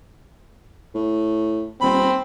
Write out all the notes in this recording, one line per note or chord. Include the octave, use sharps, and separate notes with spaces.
A2
D#1 C4 B5